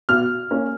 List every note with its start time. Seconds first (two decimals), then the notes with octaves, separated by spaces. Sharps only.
0.09 B2 F6
0.51 A#3 C#4